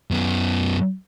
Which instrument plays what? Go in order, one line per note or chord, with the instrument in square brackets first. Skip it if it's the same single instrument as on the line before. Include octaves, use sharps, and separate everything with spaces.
[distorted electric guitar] F#2 B3